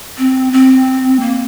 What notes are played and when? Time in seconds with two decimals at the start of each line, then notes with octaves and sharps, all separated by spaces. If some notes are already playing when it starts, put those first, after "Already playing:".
0.18 C4
0.53 C4
1.20 A#3